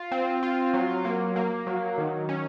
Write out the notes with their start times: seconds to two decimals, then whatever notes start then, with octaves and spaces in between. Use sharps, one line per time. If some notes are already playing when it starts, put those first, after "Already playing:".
Already playing: F4
0.12 C4
0.43 F4
0.74 F#3
1.05 A#3
1.36 A#3
1.67 F#3
1.98 D#3
2.29 C#4